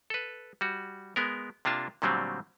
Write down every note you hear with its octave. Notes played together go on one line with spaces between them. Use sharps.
A4 B4
G3 F#4
G#3 B3 A#4
C3 A#3 D4 F4 A5
A#2 D3 F#3 G3 A3 C4